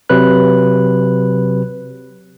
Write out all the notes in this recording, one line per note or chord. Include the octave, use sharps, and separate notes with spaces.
C3 F#3 B4 F#6